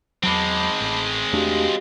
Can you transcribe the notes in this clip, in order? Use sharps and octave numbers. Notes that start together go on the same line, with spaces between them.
E2 F#3 G#3 C4 A5 B5 D6
A1
E2 A3 D4 F#4 G4 F5